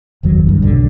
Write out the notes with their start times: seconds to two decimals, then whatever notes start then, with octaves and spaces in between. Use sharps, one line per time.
0.23 F#1 E2 D#3 F#3
0.46 C2 G2
0.62 B1 D3